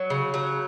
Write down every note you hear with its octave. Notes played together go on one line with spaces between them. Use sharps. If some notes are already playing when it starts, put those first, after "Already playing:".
Already playing: F#3 C#5
C#3
F#3